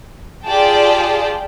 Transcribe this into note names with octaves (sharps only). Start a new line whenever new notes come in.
F4 G4 G#4 D5 G5 A5